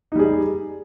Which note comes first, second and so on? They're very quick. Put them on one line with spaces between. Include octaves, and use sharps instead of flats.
D#4 G3 G#4